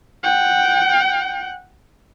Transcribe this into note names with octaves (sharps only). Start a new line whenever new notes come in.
F#5 G5